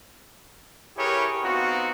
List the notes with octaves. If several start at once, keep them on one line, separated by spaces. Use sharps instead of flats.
E4 G4 G#4 A#4 B4 C#5
B3 C4 D#4 F4 F#4